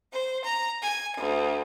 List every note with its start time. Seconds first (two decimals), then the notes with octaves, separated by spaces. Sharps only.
0.11 C5
0.44 A#5
0.81 G#5
1.17 D2